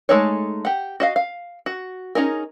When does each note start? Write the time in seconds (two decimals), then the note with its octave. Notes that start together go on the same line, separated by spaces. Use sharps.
0.09 G#3 A3 D#4 A4 C#5
0.65 G4 F#5
1.00 F#4 D#5 F5
1.16 F5
1.66 F#4
2.15 C#4 D#4 G#4 A#4